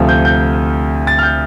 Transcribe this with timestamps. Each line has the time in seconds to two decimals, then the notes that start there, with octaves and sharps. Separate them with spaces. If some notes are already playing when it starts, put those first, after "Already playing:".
Already playing: D2 C3 F3
0.09 G6
0.25 G6
1.07 A6
1.19 F6
1.23 G6